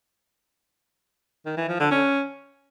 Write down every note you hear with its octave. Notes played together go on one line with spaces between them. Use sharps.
D#3
E3
F3
D3
C#4